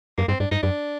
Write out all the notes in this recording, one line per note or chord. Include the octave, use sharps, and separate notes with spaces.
F#2 A#3
G2 C4
G2 D4
G2 D#4
F#2 D4